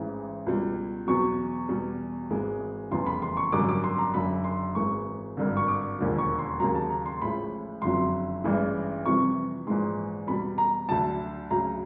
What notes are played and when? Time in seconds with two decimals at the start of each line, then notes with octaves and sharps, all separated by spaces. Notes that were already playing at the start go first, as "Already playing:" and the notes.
Already playing: A1 G#2 E3 G#3
0.46 C#2 B2 G3
1.07 E2 B2 F#3 C#6
1.69 E2 B2 G3
2.30 G#1 G#2 E3 G#3
2.91 F1 E2 C#3 E3 G3 C6
3.06 B5
3.22 C6
3.37 C#6
3.52 G#1 F#2 D3 G3 D6
3.69 D6
3.84 C6
3.98 A#5
4.14 F#1 F#2 D3 B5
4.44 C6
4.75 G#1 G#2 E3 G#3 C#6
5.37 G#1 G2 D3
5.57 C#6
5.68 D6
5.98 E1 D#2 D3 F3
6.18 C#6
6.39 C6
6.60 D#2 C#3 F#3 A#5
6.75 A5
6.90 A#5
7.06 C6
7.21 A1 A2 F3 G#3 B5
7.82 F#1 F2 D3 F#3 C6
8.44 A1 G2 E3 G#3
9.05 F2 C3 E3 G3 C#6
9.67 A#1 G#2 E3 G#3 C6
10.27 E2 B2 G3 B5
10.58 A#5
10.89 D2 D3 F#3 A5
11.51 D2 C#3 F#3 A#5